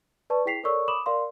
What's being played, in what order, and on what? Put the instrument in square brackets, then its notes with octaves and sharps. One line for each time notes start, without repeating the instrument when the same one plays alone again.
[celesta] B4 D5 A5 C#6
E4 G#4 G5 B6 C7 F7
A4 A#4 C#5 D5 C#6 E6
B5 D6 D#6 E7 F#7
A#4 D5 F5 C6